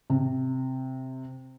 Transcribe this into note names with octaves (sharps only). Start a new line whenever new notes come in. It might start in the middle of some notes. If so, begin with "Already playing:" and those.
C3